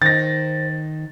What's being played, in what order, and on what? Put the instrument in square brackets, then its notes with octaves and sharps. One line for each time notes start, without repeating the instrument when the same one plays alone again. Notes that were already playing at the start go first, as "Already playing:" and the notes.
[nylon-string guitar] D#3 [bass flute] C5 [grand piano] A6 A#6